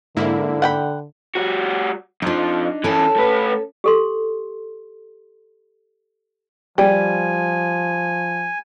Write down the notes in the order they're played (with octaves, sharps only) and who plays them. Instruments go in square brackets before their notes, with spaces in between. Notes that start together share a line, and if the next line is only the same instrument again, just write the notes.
[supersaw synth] G#2 A#3 E4 [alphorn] D3
[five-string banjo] F#5 G5 B5
[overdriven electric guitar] G3 F#4
[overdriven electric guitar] F2 F3 [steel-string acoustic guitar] D4 D#4
[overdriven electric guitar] C#3 E3 [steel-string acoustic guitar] C#4 A4
[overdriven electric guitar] A3 B4
[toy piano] G4 A4 C6
[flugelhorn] F3 [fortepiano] G3 [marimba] D5 G5 [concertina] G#5